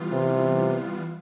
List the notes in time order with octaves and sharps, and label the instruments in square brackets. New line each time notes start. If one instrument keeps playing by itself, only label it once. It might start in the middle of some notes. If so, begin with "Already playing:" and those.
Already playing: [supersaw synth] E3 G3 B3 F4
[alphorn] C3